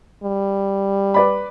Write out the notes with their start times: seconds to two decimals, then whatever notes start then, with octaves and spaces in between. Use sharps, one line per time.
0.24 G3
1.14 B4 D5 B5